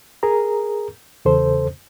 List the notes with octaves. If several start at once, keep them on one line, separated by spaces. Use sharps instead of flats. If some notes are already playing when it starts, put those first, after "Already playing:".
G#4 A#4 A#5
E2 C#3 A4 C5